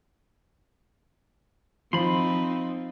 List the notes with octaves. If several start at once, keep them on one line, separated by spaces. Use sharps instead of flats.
F3 C4 D#4 F4 B5 C6